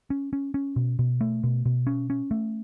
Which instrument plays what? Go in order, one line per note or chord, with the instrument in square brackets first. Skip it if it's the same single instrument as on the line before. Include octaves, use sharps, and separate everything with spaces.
[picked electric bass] C#4
C#4
C#4
B2
B2
A3
B2
B2
C#4
C#4
A3